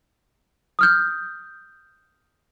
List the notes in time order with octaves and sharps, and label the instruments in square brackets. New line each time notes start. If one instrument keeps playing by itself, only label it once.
[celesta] D#6 F6 G6